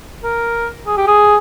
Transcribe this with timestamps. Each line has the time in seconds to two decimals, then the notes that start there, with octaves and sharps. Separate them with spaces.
0.24 A#4
0.86 G#4
0.97 G4
1.07 G#4